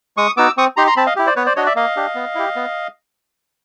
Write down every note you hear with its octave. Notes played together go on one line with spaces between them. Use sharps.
G#3 C#6 D#6
B3 D#4 F#4 D6 E6
C4 C#6 D#6
D#4 G4 A#5 C6
A#5 C6
C4 A5 B5
D#5 F5
E4 G4
C5 D5
B3 B4 C#5
C5 D5
D4 F#4 C#5 D#5
D5 E5
A#3 D#5 F5
D4 G4
B3
E4 G4
B3